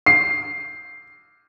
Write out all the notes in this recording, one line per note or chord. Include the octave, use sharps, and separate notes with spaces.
C7